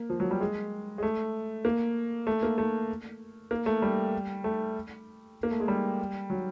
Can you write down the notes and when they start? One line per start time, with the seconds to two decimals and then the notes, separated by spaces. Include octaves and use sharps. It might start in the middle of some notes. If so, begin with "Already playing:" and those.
Already playing: A#3
0.10 F3
0.20 F#3
0.31 G3
0.41 G#3
0.98 G#3
1.03 A3
1.65 A#3
2.27 A3
2.43 A#3
2.58 A3
3.51 A#3
3.66 A3
3.82 G3
4.44 A3
5.43 A#3
5.51 A3
5.60 G#3
5.68 G3
6.30 F#3